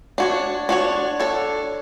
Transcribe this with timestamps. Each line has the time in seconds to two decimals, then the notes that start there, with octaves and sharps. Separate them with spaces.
0.18 D4 F#4 C#5
0.69 D4 F#4 C#5
1.20 D4 A4 C#5